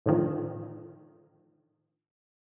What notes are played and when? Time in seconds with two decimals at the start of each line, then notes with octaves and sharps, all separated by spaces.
0.06 A2 D3 D#3 F3